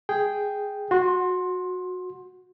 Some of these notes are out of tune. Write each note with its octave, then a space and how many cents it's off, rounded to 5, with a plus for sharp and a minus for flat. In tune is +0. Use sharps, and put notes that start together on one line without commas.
G#4 +0 G5 +0
F#4 -20 C6 +15